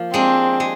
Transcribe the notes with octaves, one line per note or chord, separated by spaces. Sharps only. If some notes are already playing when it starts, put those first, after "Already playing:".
Already playing: F3 A#3
G#3 C4 D4
G#3